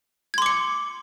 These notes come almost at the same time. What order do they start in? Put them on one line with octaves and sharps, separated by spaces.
G#6 C6 D6 C#7